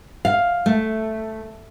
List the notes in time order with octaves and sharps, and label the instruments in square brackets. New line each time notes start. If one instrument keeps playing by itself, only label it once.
[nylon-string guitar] F5
A3